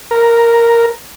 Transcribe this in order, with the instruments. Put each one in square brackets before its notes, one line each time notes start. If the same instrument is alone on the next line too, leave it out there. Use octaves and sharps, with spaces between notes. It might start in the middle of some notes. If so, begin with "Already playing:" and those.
[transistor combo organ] A#4